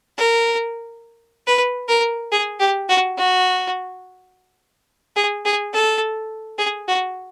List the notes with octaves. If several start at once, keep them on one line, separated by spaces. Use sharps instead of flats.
A#4
B4
A#4
G#4
G4
F#4
F#4
G#4
G#4
A4
G#4
F#4